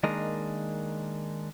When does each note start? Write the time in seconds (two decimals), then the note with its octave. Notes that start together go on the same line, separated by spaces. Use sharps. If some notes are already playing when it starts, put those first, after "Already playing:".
0.03 D#3 G#3 A#3 D4 D#5